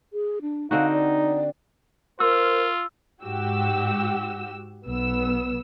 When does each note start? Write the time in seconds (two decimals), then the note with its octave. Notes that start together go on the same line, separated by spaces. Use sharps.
0.13 G#4
0.42 D4
0.71 D3 C4 D#4 F#4 F5
0.93 D5
2.20 F4 A#4 C5 E6
3.23 G#2 F#4 G4 E6
4.87 B1 B3 E6